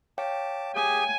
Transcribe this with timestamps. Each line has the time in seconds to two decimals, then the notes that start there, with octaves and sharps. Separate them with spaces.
0.18 C#5 F5 G5 A5 D6
0.76 G4 G#4 G#5